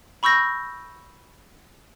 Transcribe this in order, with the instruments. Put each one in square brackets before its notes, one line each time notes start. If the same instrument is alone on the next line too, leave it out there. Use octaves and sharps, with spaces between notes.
[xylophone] B5 C#6 E6 G6 A#6